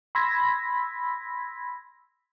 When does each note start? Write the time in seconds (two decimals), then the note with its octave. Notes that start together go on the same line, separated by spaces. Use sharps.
0.15 B5 C6 E6 G#6 A#6 B6